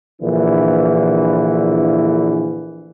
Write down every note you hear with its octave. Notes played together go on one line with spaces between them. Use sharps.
A#1 D3 E3